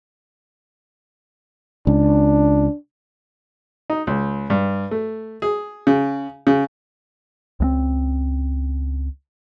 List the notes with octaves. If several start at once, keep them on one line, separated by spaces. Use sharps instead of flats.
C#2 D4
D#4
C#2
G2
A3
G#4
C#3
C#3
C#2 G#3 C4